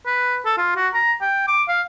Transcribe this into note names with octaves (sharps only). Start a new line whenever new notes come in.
B4
A4
F4
F#4
A#5
G5
D6
F5